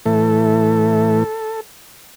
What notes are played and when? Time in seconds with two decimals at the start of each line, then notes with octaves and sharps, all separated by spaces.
0.05 A2 E3 A3 A4